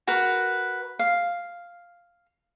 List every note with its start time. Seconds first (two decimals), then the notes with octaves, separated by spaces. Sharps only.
0.07 F#4 A#4 B4
0.99 F5